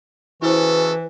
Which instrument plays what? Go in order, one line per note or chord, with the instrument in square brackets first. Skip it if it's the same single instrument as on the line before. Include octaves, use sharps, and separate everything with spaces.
[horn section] C#3 F#4 A4 [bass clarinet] E3 [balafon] E4 C5 [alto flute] B4